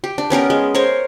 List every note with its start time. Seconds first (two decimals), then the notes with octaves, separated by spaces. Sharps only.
0.04 G4
0.18 D4
0.30 B3 C#4 G4 A#4
0.50 G#3
0.75 A#4 C5 C#5